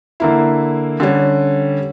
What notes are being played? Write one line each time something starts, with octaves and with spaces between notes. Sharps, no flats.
D3 A#3 E4
D3 G3 C#4